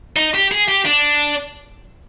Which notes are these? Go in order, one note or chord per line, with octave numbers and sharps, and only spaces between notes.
D#4
G4
G#4
G4
D4